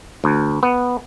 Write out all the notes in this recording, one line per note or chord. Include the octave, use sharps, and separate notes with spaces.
D2
B3